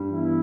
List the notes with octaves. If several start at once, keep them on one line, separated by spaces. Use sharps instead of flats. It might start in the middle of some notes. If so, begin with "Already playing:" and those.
Already playing: G2
E3 B3 E4